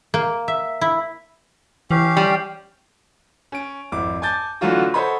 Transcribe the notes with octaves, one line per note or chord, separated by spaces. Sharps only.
A#3
E5
E4
E3 C#4 G4 F5
G3
C#4 D7
G#1 F2 E4 D6
G#5 A5 D6 G6 A6
D3 E3 F#3 A3 F4 F#4
A4 C5 C#5 D#5 F#5 B5